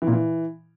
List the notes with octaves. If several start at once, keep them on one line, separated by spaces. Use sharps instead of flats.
E3
A#2
E3